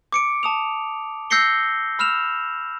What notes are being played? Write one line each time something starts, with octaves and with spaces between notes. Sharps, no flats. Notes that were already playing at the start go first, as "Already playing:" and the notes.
D6 C#7 D7
A5 D#6 F7
E6 G6 A#6 C7 C#7 G7
B5 E6 F6 E7 F7